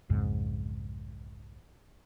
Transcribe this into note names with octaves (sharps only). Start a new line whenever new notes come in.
B1 F2 G#2 C#3